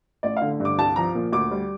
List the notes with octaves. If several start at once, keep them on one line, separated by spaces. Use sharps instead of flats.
A1 D5
F5
D3
G2
D6
C2 A5
F3 A#5
A#2
D2 D6
G3